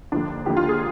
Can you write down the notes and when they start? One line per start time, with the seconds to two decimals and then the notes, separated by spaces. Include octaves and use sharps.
0.12 D#2 D3 F3 D4
0.46 D#2 D3 F3 G4
0.57 F4
0.69 G#4